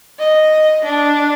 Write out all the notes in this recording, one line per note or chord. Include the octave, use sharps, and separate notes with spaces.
D#5
D4